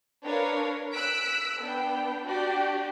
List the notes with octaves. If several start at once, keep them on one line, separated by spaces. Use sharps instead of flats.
D4 A#4 B4 C#5 F5
E6 F#6 B6 D7
B3 D4 G5
D4 F#4 G4 D5